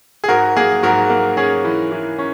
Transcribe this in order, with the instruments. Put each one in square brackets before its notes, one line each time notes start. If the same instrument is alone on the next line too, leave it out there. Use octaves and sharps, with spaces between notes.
[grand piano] G#4
G#2 F#4 A#4
A#3 G#4
G#2 F#4 A#4
A#3
C#4 G#4
E3
E3
C#4